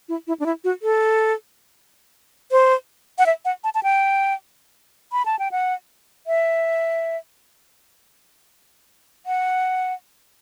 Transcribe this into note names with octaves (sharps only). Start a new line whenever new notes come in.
E4
E4
D4
E4
F#4
A4
C5
F#5
E5
F#5
A5
A5
G5
B5
A5
G5
F#5
E5
F#5